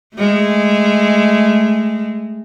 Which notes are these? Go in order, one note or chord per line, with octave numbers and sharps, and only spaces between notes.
G#3 A3